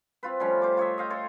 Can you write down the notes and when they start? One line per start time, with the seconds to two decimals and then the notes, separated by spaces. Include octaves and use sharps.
0.23 C4 F4 B4
0.40 F3 G3 A3 C#4
0.62 C5 D6
0.77 F4 C#5 D#5 E5
0.98 D#5 F5 G5
1.10 A4 C#5 C6